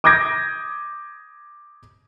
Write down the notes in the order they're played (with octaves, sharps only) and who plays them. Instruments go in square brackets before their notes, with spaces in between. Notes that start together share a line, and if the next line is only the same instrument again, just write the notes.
[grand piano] D6 D#6 G6 G#6 A#6 D7